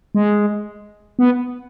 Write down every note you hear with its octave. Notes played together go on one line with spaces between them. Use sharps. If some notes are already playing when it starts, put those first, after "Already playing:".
G#3
B3